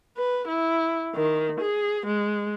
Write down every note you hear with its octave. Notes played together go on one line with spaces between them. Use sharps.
B4
E4
D#3
G#4
G#3